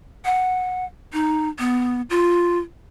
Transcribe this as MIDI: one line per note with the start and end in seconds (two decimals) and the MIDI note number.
0.25 0.85 78
1.13 1.49 63
1.59 2.01 59
2.10 2.59 65